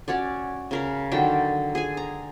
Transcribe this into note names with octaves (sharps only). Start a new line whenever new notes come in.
C#4 F#4 C#5 D5
C#3 A#4 B5
D3 D#3 F#3 G5
G#4 G#5
A#5